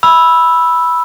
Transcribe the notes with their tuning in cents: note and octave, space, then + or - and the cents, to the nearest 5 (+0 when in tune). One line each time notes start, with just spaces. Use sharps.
B5 -5 E6 +0